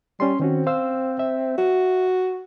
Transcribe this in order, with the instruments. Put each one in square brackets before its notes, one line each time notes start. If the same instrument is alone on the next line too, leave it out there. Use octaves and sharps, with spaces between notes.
[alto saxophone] G3 [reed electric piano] C#4 C6
[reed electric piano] D#3 C#4 F#4 [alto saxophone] C4
[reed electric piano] C5 F5 E6
E5
[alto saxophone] F#4